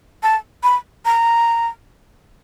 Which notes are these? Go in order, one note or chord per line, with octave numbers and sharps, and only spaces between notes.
A5
B5
A#5